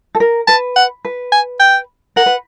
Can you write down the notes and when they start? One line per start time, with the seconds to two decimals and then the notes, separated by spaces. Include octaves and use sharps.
0.15 A4
0.20 A#4
0.48 B4 A5
0.76 F#5
1.05 B4
1.32 G#5
1.60 G5
2.16 A#4 F#5
2.26 B4